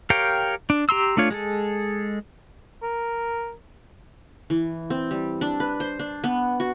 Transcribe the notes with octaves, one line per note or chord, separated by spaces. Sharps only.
G4 A#4 C#5 F5 G5
D4
G4 A#5 C6 E6
A3 D4 F4 C#5
G#3 G#4 A4
A#4
E3
C4
G3
D4
B4
C5
D4
B3
F#4